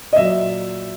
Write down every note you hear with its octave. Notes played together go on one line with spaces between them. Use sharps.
D#5
A#2 F#3 E5